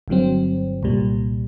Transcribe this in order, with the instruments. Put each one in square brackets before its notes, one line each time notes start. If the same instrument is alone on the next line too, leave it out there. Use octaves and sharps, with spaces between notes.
[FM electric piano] G1 G2 D3 F#3 C4
C2 A#2 G3